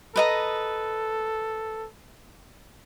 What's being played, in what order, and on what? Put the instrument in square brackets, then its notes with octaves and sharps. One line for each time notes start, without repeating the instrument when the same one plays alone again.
[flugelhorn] A4 [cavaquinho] B4 D#5 A#5